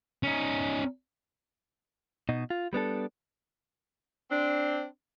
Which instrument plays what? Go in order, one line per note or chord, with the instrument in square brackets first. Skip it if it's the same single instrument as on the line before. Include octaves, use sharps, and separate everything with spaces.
[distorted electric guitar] C#4 D#4
[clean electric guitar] B2 D#4
F4
G3 B3 D4 A4
[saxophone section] C4 D4